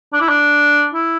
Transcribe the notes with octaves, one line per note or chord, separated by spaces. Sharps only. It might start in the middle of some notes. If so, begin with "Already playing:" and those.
D4
E4
D4
E4